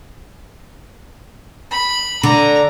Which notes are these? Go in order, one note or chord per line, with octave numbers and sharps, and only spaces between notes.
B5
D3 A#5